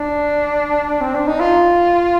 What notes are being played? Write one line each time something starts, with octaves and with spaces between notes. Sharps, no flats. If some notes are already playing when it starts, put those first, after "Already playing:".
Already playing: D4
C4
D4
D#4
F4